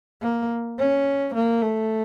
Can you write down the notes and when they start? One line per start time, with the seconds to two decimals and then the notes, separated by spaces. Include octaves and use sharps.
0.21 A#3
0.78 C#4
1.34 A#3
1.62 A3